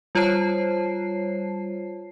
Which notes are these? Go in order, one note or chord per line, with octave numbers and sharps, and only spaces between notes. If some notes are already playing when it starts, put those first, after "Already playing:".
G3 F4 C5 C#5 A5 C7